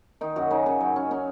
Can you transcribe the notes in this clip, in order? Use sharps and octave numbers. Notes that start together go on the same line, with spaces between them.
D#3 D#4
F#2 F#4
C#3 D#4
C#3
F#3
C#4
C#4 D#4